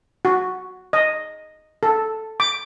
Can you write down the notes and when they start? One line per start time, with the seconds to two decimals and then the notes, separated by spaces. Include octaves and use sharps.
0.25 F#4
0.93 D#5
1.83 A4
2.40 D6